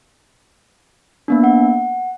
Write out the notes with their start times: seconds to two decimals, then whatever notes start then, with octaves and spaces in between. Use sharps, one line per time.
1.28 A#3 B3 D4
1.44 F#5